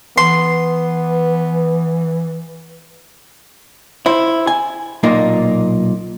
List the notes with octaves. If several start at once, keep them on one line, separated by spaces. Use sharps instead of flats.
E3 B3 C6
E4 C5
G#5
B1 A#2 A#3 D#4